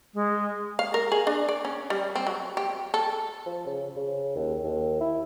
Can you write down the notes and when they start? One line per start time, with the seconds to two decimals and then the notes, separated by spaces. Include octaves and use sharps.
0.14 G#3
0.79 F5
0.94 A#4
1.12 G#4
1.27 D4
1.49 D5
1.65 C#4
1.90 G3
2.15 C4
2.27 F#3
2.57 G4
2.94 A4
3.46 F3
3.66 C#3
3.96 C#3
4.36 D#2
4.64 D#2
5.01 E4